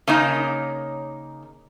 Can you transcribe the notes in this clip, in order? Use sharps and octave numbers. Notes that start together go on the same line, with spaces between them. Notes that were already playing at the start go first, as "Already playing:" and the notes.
C#3 A#3 D#4